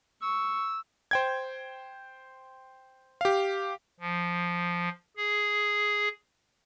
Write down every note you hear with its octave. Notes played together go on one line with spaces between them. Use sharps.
C#6 E6
C5 G5 G#6
G4 F5
F3
G#4